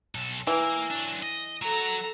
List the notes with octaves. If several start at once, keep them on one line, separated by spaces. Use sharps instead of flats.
B1 A4
E3 A#3 A#4
F#3 D4
D#5
F#3 A4 A#5